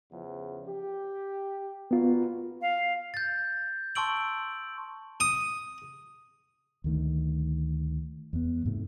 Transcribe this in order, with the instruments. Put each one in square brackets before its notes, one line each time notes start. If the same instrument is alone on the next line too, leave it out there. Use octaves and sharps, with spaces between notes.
[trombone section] E2 C#3 F3
G4
[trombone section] A#3 F#4 B4 [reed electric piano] B3 F4
[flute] F5
[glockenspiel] G6 A6
A5 C6 C#6 E6 D7 F#7
[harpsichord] D#6
[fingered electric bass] D2 D#3 A3
E2 B3
G#2 C3 A3